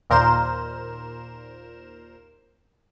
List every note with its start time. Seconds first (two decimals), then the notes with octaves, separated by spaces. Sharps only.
0.10 D#2 A#2 A#4 C5 E7